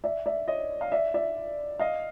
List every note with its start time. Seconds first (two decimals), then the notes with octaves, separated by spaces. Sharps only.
0.04 D5 E5
0.26 D5 E5
0.48 C#5 D#5
0.81 F5
0.92 D5 E5
1.14 D5 E5
1.79 D#5 F5